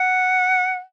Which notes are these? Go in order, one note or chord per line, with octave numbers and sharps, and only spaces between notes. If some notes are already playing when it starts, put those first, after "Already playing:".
Already playing: F#5